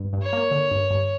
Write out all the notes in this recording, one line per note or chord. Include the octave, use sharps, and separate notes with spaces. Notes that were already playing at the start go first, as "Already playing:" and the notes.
Already playing: G2
G2
C#5
A#3
D3
G2
G2